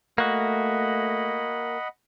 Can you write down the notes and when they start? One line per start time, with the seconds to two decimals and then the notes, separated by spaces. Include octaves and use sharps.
0.18 A3 A#3 F#4 D#5 F#5 B5